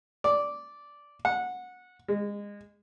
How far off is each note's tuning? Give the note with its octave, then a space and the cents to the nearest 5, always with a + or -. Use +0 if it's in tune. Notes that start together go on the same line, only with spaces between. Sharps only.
D5 -10
F#5 -20
G#3 -25